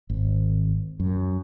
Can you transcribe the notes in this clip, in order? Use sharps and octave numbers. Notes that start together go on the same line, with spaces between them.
G#1
F#2